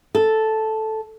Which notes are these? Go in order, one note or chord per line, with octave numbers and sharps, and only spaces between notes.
A4